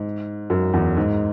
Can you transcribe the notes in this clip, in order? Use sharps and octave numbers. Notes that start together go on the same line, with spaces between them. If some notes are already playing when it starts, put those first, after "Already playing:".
Already playing: G#2
F#2
E2
G#2